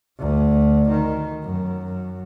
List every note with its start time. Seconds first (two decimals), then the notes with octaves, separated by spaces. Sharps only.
0.19 D2
0.89 D#3
1.44 F#2